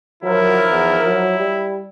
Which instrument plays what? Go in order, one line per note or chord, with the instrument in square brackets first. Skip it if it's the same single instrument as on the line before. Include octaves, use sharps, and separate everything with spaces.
[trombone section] D#3 F3 A#4 [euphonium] F#3 [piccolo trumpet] E4
[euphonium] E2
F#3
G3